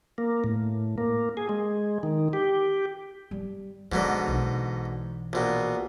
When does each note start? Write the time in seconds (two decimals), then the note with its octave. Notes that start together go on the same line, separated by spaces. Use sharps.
0.18 A#3
0.44 A2
0.98 A#3
1.37 G#4
1.49 G#3
2.03 D#3
2.33 G4
3.31 G3
3.92 G#2 B2 D3 F#3
4.26 B1 E3
5.33 A#1 B2